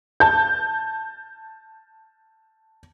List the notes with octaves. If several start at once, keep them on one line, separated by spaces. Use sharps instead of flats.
A5 G6